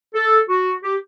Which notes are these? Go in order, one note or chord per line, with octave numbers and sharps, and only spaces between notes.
A4
F#4
G4